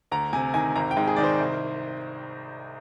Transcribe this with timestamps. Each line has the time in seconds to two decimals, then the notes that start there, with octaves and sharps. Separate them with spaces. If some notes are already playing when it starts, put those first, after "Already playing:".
0.11 D2 A#5
0.33 C3 G#5
0.54 D#3 G#5
0.76 G#1 A#5
0.91 G5
0.97 G#2
1.07 G#4
1.16 D#3 D5
1.23 C5
1.39 C2